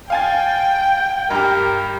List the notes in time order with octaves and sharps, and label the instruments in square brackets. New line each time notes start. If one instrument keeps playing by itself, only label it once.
[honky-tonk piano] F5 G#5 A6 [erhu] G5
[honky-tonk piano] G2 G4 [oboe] A#4